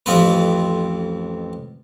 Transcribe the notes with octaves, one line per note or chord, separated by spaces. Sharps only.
A1 F2 F3 C4 B4